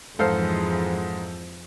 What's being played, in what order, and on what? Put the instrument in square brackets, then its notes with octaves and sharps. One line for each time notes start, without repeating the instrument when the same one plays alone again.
[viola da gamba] F2 [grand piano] G#2 [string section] E3 F3 G#3 [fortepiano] A4 C5 F5